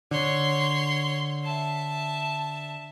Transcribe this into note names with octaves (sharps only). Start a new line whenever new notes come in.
D3 C#5 C6
E5 A5